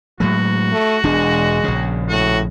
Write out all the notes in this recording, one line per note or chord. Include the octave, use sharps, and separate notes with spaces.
A2 F#3 G#3 F#4
A3
E1 G#3 D4
A#1 C#3
A2 F#4